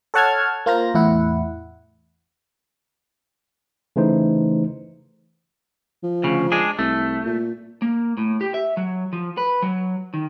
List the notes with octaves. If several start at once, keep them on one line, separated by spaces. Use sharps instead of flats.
A4 C#5 F#5 A5 F6 G#6
A#3 F4 C5 A#5 A#6
E2 A2 E4 F#5
C#3 E3 A3 D#4 C5
F3
D2 C#3
G#3 D4 G#4
C2 A3
A#2
A#3
A2
G4
E5
F#3
F3
B4
F#3
D#3